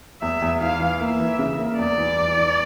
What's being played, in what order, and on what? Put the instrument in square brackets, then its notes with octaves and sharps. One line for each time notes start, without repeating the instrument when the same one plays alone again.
[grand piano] E2 [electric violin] E5
[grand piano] E2
[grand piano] E3 [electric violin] F5
[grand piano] E3
[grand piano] A#3 [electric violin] E5
[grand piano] E3
C#3
A#3
[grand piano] E2 [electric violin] D5
[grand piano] E3
E2
E3